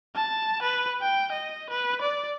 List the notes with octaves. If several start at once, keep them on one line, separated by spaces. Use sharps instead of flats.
A5
B4
G5
D#5
B4
D5